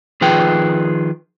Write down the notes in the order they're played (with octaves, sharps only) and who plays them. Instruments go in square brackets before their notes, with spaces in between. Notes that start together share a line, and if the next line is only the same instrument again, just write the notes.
[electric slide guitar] D#3 F3 F4 G#4 B4 G5